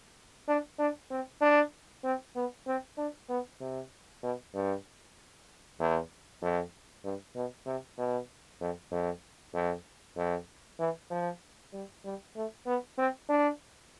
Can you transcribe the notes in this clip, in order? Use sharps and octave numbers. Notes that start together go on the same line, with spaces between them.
D4
D4
C4
D4
C4
B3
C4
D4
B3
C3
B2
G2
E2
F2
G2
B2
C3
B2
F2
F2
F2
F2
E3
F3
G3
G3
A3
B3
C4
D4